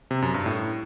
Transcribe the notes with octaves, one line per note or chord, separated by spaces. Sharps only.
C3
F#2
G2
A2